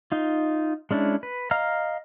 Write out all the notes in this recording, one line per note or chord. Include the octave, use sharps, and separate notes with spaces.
D#4 F4
G#3 C#4 D4 E4
B4
D#5 F5 A#5 F6